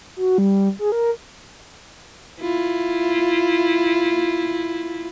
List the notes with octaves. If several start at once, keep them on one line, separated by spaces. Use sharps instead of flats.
F#4
G3
G#4
A#4
E4 F4